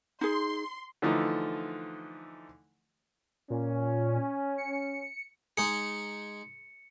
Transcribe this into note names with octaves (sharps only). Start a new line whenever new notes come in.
D#4 G#4 C6
D3 E3 F3 A3 D#4
A#2 C#4
C#7
G#3 D#4 G#4 C#7